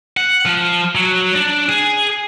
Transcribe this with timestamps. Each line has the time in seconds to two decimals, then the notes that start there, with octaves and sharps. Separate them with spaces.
0.17 F#5
0.46 F3
0.95 F#3
1.36 D4
1.69 G#4